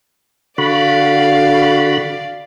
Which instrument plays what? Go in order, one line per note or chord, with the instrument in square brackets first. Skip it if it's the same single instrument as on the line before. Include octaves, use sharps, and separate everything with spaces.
[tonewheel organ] D3 F#4 B5 [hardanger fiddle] D5 F5